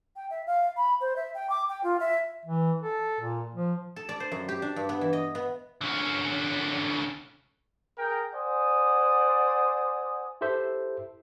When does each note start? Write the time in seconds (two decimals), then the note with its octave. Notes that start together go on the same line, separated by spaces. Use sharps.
0.16 G5
0.30 E5
0.47 F5
0.77 B5
1.01 C5
1.16 E5
1.35 G5
1.50 D6
1.69 G5
1.83 F4
2.00 E5
2.45 E3
2.82 A4
3.20 A#2
3.55 F3
3.96 A4
4.09 D5
4.20 C5
4.32 F#2
4.49 G4
4.62 D4
4.76 G2
4.89 B3
5.01 E3
5.13 D#5
5.35 B3
5.81 D3 C#4
7.98 G#4 A#4 G5
8.34 C5 D5 F#5 G#5 D#6
10.41 E4 G4 A4 C5 E5